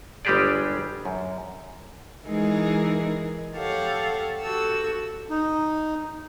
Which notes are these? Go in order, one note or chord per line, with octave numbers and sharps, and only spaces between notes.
G1 G3 G#3 G4 G#4 D5
F#2
E3 G#3 D#4 E4 G#4 A#4
G4 A4 C#5 F5 F#5
F#4 G4 A4 E6
D#4